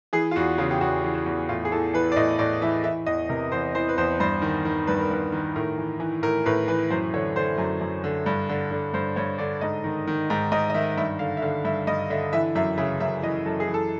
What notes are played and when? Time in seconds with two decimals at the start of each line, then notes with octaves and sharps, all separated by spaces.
0.13 E3 G#4
0.31 F4
0.36 E2 F#4
0.58 C#3 F4
0.71 G4
0.81 E2 F#4
1.03 E3
1.15 F#4
1.26 E2
1.49 A2 F4
1.65 G#4
1.72 E3 A4
1.93 E3 B4
2.12 D5
2.16 A2 D#5
2.39 A2 D5
2.62 E3 E5
2.84 E3 E5
3.07 E2 D#5
3.29 C3 A#4
3.52 E2 C5
3.75 E3 C5
3.89 B4
3.97 E2 C5
4.20 G2 C5
4.42 D#3
4.65 D#3
4.87 G2 B4
5.00 A#4
5.10 G2 B4
5.32 D#3
5.56 A2 A#4
5.78 E3
6.00 E3
6.22 A2 A#4
6.46 A2 B4
6.68 E3 B4
6.90 F#2 C5
7.13 D3 C#5
7.36 D3 C5
7.58 F#2
7.81 F#2
8.04 D3
8.26 G2
8.49 D3
8.71 D3
8.94 G2 C5
9.16 G2 C#5
9.38 D3 D5
9.61 G#2 D#5
9.84 D#3
10.07 D#3
10.30 G#2
10.52 G#2 D#5
10.70 D#5
10.74 D#3 E5
10.97 G2 E5
11.19 D3 F5
11.37 E5
11.42 D3 F5
11.64 G2 E5
11.87 G2 D#5
12.10 D3 E5
12.33 E3 E5
12.55 F#2 E5
12.78 C#3 E5
13.00 F#2 E5
13.22 E3 D#5
13.46 F#2 A4
13.60 G#4
13.67 E3
13.74 A4